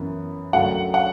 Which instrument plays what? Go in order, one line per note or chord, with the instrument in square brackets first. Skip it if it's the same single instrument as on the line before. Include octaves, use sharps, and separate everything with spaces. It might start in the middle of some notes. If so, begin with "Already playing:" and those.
Already playing: [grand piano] F#2 E3 B3
F#2 D3 F#3 A3 F#5
F#5